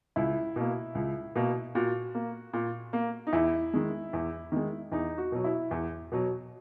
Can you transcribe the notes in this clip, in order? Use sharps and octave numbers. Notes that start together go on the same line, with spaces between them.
C#2 E4
B2 A#3
C#2
B2 A#3
A#2 F#4
A#3
A#2
A#3
D#4
E2 E4
D#3 G#3
E2
D#3 G#3
E2 D#4
F#4
B2 F#3
E4
E2
B2 F#3